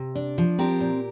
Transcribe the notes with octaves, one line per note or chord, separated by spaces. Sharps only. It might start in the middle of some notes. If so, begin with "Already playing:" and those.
Already playing: C3
D4
F3
C4 G4 A#4
A#2